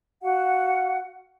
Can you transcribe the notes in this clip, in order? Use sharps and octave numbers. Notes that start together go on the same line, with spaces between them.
F#4 F5 F#5